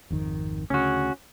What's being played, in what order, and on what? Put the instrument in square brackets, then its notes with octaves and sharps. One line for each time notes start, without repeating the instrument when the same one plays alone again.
[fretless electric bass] G#1 F2 D#3
[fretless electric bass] D2 C#3 [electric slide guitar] C#4 F#4